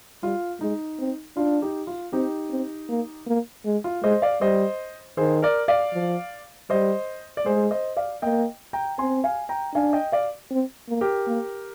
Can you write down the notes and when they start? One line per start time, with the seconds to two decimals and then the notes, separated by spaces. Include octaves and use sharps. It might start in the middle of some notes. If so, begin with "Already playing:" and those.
0.23 G3 F4
0.61 G#3 D#4
0.99 C4
1.37 D4 F4
1.62 D#4 G4
1.87 F4
2.13 C4 D#4 G4
2.51 C4
2.89 A#3
3.27 A#3
3.65 G#3
3.84 F4
4.03 G#3 C5 D#5
4.22 D5 F5
4.41 G3 C5 D#5
5.17 D#3 G#4 C5
5.42 A#4 D5
5.68 D5 F5
5.93 F3
6.70 G3 C5 D#5
7.37 D5
7.46 G#3 G#4 C5
7.71 C5 D#5
7.96 D5 F5
8.22 A#3 D#5 G5
8.73 G5 A#5
8.98 C4 G#5 C6
9.24 F5 G#5
9.49 G5 A#5
9.74 D4 F5 G#5
9.93 D#5 G5
10.12 D5 F5
10.51 C4
10.89 A#3
11.01 G4 A#4
11.27 A#3